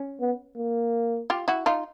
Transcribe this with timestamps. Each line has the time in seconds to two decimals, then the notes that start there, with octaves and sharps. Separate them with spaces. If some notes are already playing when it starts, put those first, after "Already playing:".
Already playing: C#4
0.21 B3
0.57 A#3
1.30 F4 G4
1.48 E4 F#4
1.66 D#4 F4